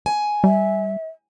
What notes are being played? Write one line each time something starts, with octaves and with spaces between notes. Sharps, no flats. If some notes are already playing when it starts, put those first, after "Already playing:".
G#5
G3 E5